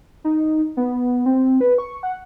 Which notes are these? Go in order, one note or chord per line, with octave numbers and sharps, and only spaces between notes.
D#4
B3
C4
B4
C#6
F#5